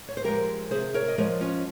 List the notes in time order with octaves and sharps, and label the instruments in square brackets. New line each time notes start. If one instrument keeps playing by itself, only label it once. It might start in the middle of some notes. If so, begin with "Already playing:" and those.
[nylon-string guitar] C#5
C5
F3 G#3 G4 A#4
C3 G#4 C5
A#4 C#5
D#5
F3 G#3 A#4 C#5
C#4 F4